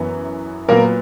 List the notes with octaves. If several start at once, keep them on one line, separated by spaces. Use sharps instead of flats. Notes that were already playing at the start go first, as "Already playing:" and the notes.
Already playing: F#2 E3 B3
A#2 F#3 A#3 B3 A#4